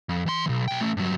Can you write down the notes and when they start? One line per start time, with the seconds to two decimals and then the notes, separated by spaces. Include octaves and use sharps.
0.09 F2
0.26 E3 C6
0.46 B1 E3
0.68 B1 G5
0.81 A3 C#4
0.97 G2 F#3